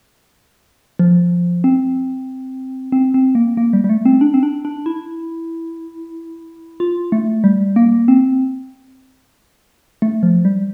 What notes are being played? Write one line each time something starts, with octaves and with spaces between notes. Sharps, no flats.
F3
C4
C4
C4
A#3
A#3
G3
G3
A3
C4
D4
C4
D4
D4
E4
F4
A3
G3
A#3
C4
A3
F3
G3